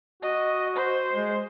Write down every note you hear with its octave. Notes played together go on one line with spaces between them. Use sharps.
F#4 D#5
C5
G#3